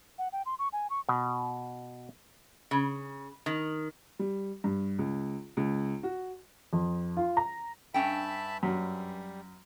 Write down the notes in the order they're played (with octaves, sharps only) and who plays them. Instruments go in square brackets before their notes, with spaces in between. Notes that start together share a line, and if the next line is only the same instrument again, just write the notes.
[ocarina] F#5
G5
C6
C#6
G#5
C#6
[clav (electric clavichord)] B2
[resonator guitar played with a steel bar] C#3
D#3
[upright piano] G3
G2
C#2
C#2
F#4
F2
F4
A#5
[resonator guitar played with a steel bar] G2 C#4 G5 [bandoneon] E5 A5 B5
[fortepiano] F#2 [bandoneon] G3